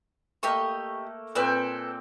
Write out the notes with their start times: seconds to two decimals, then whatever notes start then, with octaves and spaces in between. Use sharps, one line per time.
0.43 A3 A#3 G4 D#5 C#6
1.35 A#2 C4 A4 B4 G5 G#5